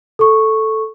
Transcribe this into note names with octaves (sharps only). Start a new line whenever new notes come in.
A4 C#6